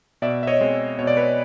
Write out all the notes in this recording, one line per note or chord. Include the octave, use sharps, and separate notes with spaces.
B2 D5 E5
E5
C#5 D#5
G#3 C4
B2 C#5
D5
B4 C#5